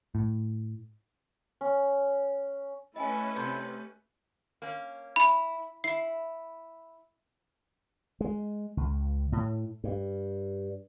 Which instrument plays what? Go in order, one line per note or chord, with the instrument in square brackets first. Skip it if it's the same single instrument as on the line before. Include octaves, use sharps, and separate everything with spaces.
[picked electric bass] A2
[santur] C#4
[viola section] A3 C#4 B4 [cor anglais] E4 [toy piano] D#5 G5 G#5
[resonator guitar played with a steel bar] C3
A#3 C#4
[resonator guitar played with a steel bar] E4 [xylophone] B5
[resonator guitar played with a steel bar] E4 [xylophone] C7
[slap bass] G#3
C#2
A2
G2